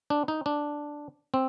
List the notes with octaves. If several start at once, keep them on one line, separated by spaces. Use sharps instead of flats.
D4
D#4
D4
C4